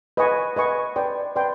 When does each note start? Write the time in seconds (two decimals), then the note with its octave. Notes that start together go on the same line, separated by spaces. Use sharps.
0.17 B4 D#5 G#5 C#6
0.56 B4 D#5 G#5 C#6
0.96 B4 D5 G5 C6
1.36 B4 D5 G5 C6